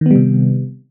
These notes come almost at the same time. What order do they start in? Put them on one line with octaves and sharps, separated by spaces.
D#3 B3 G3 C3